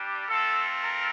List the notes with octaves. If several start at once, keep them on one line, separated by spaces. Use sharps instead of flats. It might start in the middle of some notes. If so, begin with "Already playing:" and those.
Already playing: G3 D4 G4
A3 C4 F4 A4
A#4